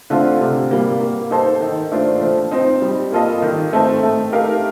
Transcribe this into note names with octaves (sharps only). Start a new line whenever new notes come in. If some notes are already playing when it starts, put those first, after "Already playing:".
D3 A3 C4 F4
C3
G3 A#3
A#3
D#4 A4 C5
D#3
A3 D4 F4 C5
F3
C4 D#4
G3
A#3 F4 A4 D#5
D#3
A3 C4 D#4 A4
A3
D#4 G4 A#4 F5